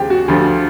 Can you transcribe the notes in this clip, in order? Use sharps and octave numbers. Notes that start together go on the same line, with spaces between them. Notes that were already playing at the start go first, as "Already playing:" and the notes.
Already playing: D#2 C#3 F3 G4 G#4
F#4
D2 D3 F3